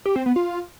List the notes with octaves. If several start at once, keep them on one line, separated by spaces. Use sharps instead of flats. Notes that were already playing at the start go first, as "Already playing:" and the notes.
G4
C4
B3
F4